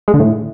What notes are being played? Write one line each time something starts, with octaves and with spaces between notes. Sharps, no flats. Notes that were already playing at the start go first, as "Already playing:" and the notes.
G#3
D3
A2